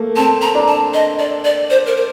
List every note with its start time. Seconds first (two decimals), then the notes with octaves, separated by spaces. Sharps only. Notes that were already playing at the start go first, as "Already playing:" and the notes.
Already playing: A3 A#3
0.16 C4 A5
0.42 A#5
0.55 D4
0.68 A5
0.94 D#5
1.19 D5
1.45 D5
1.70 C5
1.86 A#4
1.96 C5